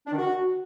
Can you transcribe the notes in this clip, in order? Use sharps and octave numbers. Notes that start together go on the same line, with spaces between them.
D4
D#3
F#4